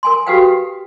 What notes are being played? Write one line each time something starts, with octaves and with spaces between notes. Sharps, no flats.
A#4 G#5 C6
F#4 G4 A4 B4 F5 G5